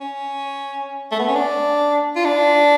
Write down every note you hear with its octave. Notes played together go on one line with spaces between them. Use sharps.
C#4
A3
B3
C#4
D4
F4
D4